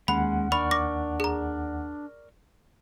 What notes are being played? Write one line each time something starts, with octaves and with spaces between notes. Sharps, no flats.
D#2 G#3 C#4 F#5 B5
D4 A#4 D5 B5 C#6
D6 A#6
G#4 A#5